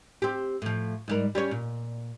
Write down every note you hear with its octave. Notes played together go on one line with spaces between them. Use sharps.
C4 G4
A2 F3
G#2 G3 A#4
G3 C#4 C#5
A#2